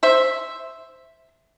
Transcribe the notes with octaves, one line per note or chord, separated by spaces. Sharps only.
C5 E5